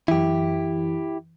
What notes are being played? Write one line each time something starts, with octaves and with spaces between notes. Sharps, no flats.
F#2 E3 E4 G4